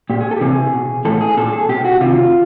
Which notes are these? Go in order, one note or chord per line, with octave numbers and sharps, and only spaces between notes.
A#2 G4
G#4
A4
G4
C3 E3 G#4
B2
A2 E3 A4
G#4
A#2 A4
G#4
B2 G4
F#4
C3 D#3 F4